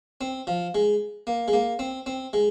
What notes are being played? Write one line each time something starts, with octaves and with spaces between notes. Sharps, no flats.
C4
F3
G#3
A#3
G#3
A#3
C4
C4
G#3